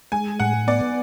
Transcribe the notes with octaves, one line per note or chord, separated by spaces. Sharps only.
G#3 G#5
A2 F#5
B3 D5